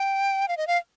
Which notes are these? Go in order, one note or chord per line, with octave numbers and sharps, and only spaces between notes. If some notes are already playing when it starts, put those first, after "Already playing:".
Already playing: G5
F5
D#5
F5